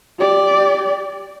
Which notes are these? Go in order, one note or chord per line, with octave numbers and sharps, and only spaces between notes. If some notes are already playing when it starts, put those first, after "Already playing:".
G4 D5